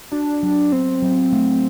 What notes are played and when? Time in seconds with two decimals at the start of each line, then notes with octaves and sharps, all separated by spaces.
0.12 D4 F#4
0.43 F#3
0.72 B3 C4
1.02 F#3
1.33 A3